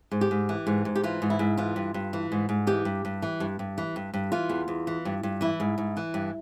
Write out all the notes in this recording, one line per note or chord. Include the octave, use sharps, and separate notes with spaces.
G#2
G4
G#2
E3
G#2
G#2
G4
E3 F4
G#2
E4
G#2
E3 F4
G2
G2
E3
G#2
G#2
E3 G4
G2
G2
E3
G2
G2
E3
G2
G2
E3 F4
E2
E2
E3
G2
G2
E3 E4
G#2
G#2
E3
G2